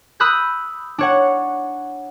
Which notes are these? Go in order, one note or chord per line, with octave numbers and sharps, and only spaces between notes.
B5 D#6 E6 F#6 G6
D4 C#5 F#5